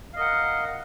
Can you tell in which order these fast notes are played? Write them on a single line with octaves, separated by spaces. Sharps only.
F5 D#5 A#4 F#5